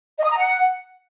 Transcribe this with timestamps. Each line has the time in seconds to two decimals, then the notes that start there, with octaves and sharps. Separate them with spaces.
0.18 D#5
0.25 D#6
0.31 A#5
0.37 F#5